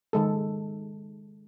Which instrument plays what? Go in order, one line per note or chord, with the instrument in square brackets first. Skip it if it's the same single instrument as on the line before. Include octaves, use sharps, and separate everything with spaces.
[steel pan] D#3 G#3 A4